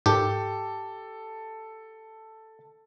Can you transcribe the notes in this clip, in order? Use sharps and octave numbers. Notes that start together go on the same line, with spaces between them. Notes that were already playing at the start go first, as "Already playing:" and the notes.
G#2 G4 A4